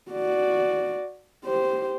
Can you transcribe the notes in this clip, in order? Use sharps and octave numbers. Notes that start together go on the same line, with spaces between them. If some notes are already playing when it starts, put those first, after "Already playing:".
F#4 D5
G4 C5